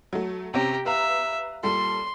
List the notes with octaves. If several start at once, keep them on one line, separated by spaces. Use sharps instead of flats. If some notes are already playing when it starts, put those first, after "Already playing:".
F#3 A3
C3 C4 C#4 G4 A#5
B4 E5 F5 A#5
A#2 G3 A4 C6